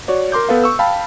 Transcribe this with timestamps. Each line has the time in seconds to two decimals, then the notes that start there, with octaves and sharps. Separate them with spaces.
0.08 F#4 C#5 D5
0.32 A#4 C6 D6 G6
0.49 B3 A4 B4 F5
0.64 C#6 E6
0.79 F5 G5 A5 B5